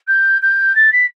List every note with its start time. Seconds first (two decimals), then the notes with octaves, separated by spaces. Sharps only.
0.07 G6
0.42 G6
0.75 A6
0.92 B6